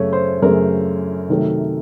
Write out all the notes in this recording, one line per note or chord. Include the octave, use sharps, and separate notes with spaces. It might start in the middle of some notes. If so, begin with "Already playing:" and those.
Already playing: F#2 C#3 A3 C#5
C5
F#2 C#3 A3 A#4
C3 D#3 F#3 A3